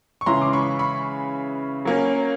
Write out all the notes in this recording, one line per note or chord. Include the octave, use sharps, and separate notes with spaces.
C#6
C#3 E3 G#3 C#4 E4 A#5 C6
D6
B5 C#6
B5 C#6
F#3 A#3 C#4